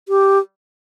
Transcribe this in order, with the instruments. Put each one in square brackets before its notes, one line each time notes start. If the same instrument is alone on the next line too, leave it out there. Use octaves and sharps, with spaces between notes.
[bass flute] G4